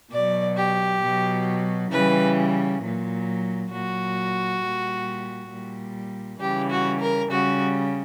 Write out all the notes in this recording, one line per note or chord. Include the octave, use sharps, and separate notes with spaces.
B2 F#3 D5
G4
B2 F#3
C#3 E3 G3 B4
A#2 F#3
A#2 F#3 F#4
A#2 G3
A#2 G3
C#3 E3 G3 G4
F#4
A#4
C#3 G3 F#4